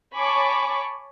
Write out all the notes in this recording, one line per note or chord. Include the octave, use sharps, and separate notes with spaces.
C#5 G#5 A5 B5 C#6 D6